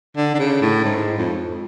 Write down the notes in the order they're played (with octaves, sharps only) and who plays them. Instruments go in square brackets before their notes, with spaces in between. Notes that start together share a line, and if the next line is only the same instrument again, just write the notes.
[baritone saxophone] D3
D3
C#3
A2
G#2
F2